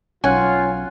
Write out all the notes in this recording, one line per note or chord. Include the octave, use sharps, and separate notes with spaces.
B1 C#4 F4 F#5 G#5 F#6